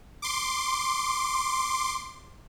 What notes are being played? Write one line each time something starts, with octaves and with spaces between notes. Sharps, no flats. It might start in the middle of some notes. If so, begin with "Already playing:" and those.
C6 D6